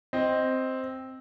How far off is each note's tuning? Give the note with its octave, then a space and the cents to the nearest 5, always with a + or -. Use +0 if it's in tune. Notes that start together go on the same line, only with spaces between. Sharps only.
C4 +0 D#5 +0